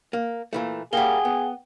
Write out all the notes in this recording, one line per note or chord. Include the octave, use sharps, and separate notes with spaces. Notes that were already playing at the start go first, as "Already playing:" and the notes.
A#3
A#2 E3 A3
G3 A#3 G#4 F#5 G5 G7
B3